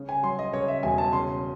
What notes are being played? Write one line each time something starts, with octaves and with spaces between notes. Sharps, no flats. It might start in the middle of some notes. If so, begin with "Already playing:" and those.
Already playing: C#3
G#5
F#3 C6
D#5
C#3 C#5
E5
E1 G#5
A5
C#3 C6